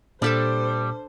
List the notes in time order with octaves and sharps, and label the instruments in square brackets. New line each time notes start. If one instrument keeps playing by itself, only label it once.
[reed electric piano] A#2 [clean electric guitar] G3 [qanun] D4 A4 A5 [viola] C5